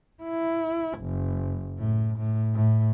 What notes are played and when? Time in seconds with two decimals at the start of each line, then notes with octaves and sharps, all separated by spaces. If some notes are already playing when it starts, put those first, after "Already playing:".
0.23 E4
0.99 F#1
1.79 A2
2.18 A2
2.54 A2